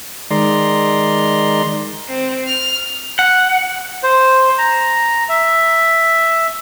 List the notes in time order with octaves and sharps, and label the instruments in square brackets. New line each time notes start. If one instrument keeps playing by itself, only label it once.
[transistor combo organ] D#3 G#3 D5 A#5 C6
[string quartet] C4
F6
[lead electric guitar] F#5
[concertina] C5
A#5
E5